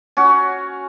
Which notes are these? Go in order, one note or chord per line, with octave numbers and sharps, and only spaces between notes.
C#4 F#4